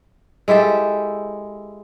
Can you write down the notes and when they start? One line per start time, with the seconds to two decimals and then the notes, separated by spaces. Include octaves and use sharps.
0.48 G#3 E4 G4 A4